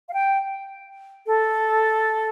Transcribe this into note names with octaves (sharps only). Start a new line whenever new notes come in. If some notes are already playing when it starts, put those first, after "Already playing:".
F5
G5
A4